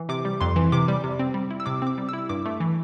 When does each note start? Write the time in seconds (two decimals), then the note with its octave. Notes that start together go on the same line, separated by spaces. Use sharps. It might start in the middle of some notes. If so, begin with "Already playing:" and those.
Already playing: E3
0.09 C3 D6
0.25 G3
0.41 F2 C6
0.56 E3
0.72 C3 D6
0.88 G3
1.04 C3
1.19 C4
1.34 G3
1.51 E4
1.60 E6
1.66 C3 D6
1.82 C4 D6
1.98 G3
2.09 E4 E6
2.29 G2 D6
2.46 A3
2.60 E3